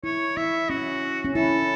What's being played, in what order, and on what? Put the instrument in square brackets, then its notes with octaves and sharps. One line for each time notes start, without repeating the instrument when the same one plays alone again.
[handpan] E4 [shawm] C#5
[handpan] E4 [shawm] E5
[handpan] C#4 [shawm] F#4
[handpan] C#4
[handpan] E4 [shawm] A4